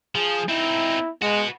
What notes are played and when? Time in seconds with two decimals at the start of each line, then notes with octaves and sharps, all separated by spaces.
0.15 F3 G#4
0.49 C4 D#4 E4
1.22 G#3 F#4 B4